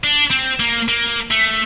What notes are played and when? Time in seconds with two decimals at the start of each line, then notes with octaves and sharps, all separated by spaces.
0.04 D4
0.31 C4
0.60 A#3
0.88 A#3
1.31 A3